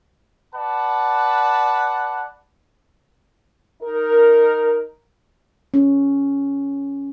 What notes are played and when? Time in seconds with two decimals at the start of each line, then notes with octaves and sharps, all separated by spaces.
0.55 B4 D5 F#5 A5
3.82 D#4 A#4
5.74 C#4